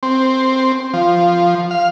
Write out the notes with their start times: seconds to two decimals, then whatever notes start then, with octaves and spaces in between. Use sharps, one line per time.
0.03 C4
0.94 F3
1.71 F5